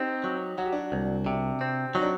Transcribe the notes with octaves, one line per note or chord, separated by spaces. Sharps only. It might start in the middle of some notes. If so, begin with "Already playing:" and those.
Already playing: C4 D#4 G4
F#3
F#3 F#4
G4
D4 F#4
C2
C3
C4
F#3 D#4
D4